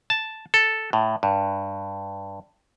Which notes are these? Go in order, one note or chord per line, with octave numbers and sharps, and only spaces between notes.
A5
A4
A2
G2